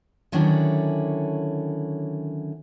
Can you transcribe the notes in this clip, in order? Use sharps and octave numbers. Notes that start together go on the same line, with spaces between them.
D3 D#3 F#3 C#4 D4 E4